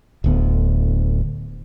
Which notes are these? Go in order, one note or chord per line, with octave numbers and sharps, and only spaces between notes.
D1 D2 B3